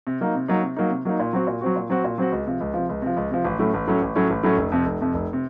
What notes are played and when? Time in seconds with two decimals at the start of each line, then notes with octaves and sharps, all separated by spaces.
0.07 C3
0.21 F#3 A#3 D#4
0.35 C3
0.48 F#3 A#3 D#4
0.63 C3
0.77 F#3 A#3 D#4
0.90 C3
1.05 F#3 A#3 D#4
1.20 A#2
1.33 F#3 C4 F#4
1.47 A#2
1.61 F#3 C4 F#4
1.76 A#2
1.90 F#3 C4 F#4
2.04 A#2
2.18 F#3 C4 F#4
2.32 C#2
2.47 C3 F3
2.60 C#2
2.74 C3 F3
2.89 C#2
3.02 C3 F3
3.16 C#2
3.31 C3 F3
3.44 A1
3.59 A2 F#3 A3 C#4
3.74 A1
3.87 A2 F#3 A3 C#4
4.02 A1
4.15 A2 F#3 A3 C#4
4.30 A1
4.43 A2 F#3 A3 C#4
4.57 F1
4.72 F2 C3
4.86 F1
5.01 F2 C3
5.14 F1
5.33 C3